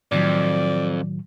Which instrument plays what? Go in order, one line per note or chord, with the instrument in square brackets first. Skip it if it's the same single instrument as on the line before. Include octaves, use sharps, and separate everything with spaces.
[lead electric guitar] F2 [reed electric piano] A2 D#3 F#3 [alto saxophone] D5